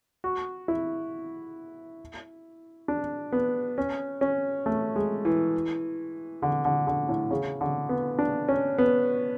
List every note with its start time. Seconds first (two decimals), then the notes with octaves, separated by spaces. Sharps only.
0.24 F#4
0.68 E4
2.88 D4
3.33 B3
3.78 C#4
4.21 C#4
4.66 A3
4.96 G#3
5.25 E3
6.42 D3
6.65 D3
6.87 D3
7.09 A2
7.31 C#3
7.61 D3
7.89 B3
8.19 D4
8.49 C#4
8.78 B3